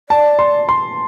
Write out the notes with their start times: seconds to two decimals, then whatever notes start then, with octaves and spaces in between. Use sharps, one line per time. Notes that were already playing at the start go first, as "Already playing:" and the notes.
0.09 D5 A5
0.39 C6
0.69 C6